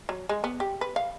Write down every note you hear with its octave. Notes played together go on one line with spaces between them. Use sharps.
F#3
G#3
B3
G4
B4
F5